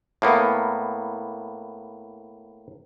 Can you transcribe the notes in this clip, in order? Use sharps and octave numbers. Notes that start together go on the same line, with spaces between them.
A2 A#3 B3